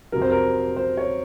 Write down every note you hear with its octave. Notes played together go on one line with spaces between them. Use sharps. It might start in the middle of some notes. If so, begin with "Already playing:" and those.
F2 C3 F#3 A#4
C5
A#4
C5
C#5